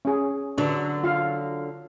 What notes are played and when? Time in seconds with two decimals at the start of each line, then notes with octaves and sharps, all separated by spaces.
0.05 C#4 G#4
0.58 D3 F#3 D4 B4
1.04 F4 F5